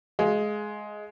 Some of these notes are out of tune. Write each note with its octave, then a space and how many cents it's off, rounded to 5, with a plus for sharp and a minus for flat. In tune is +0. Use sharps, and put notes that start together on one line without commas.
G#3 +15 F5 +0